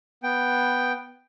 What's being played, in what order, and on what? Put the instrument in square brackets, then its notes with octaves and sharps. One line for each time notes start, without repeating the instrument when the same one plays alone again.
[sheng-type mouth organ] B3 G5